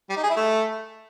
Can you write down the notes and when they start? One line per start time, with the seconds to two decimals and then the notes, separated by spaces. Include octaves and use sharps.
0.10 G3
0.16 D#4
0.23 G#4
0.30 E4
0.36 A3